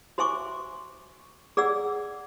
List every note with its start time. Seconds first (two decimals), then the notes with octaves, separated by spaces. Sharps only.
0.18 F#4 C5 E5 G#5 C#6 D6
1.57 G#4 D5 F#5 E6